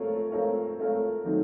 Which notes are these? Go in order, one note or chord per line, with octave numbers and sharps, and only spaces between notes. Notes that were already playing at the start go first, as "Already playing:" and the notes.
Already playing: A3 C4 F4 A#4 C#5
A3 C4 F4 A#4 C#5
A3 C4 F4 A#4 C#5
D#3 F#3 A3 C4 D#4